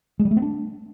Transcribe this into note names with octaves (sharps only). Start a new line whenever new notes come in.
G#3
G3
A3
B3
D4